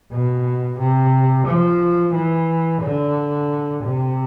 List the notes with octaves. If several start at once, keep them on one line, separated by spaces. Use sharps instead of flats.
B2
C3
F3
E3
D3
C3